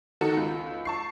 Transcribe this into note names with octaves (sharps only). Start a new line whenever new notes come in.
D#3 D#4 F#4 A4
C#2
A5 C#6 C7